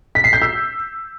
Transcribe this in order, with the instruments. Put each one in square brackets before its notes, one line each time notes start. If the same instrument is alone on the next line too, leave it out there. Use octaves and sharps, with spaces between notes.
[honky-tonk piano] B6
C7
G6
E6